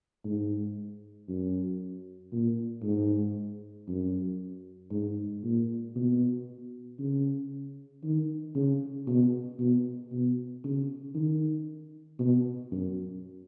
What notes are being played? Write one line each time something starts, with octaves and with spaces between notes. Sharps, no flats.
G#2
F#2
A#2
G#2
F#2
G#2
A#2
B2
C#3
D#3
C#3
B2
B2
B2
C#3
D#3
B2
F#2